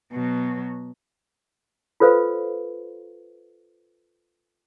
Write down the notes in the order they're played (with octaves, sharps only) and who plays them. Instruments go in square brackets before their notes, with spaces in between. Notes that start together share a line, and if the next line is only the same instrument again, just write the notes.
[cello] B2 F#3
[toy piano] F4 A4 B4 C5 F5